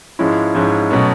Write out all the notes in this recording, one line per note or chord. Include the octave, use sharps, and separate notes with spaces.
G#2 F3 G#3 C#4 E4
G#2 F3 G#3 C#4 E4
B2 F#3 A3 C#4